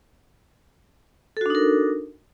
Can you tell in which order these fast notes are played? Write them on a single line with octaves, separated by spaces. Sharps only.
A4 F#4 D4 D#4 A#4